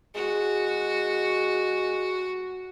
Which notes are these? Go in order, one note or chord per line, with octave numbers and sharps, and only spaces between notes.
G#3 F#4